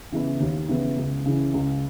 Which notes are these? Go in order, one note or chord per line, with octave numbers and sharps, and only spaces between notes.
C#3 E3 B3 E4
D#2
C#3 E3 B3 E4
C#2
C#3 E3
C#2